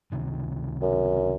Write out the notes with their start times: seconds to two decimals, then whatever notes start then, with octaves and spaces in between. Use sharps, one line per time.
0.12 C#2 C3 D#3
0.82 F#2